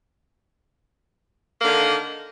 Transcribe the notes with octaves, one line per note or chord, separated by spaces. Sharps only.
D3 D#3 A#3